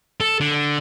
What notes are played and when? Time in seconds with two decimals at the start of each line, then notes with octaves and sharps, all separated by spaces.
0.20 A4
0.40 D3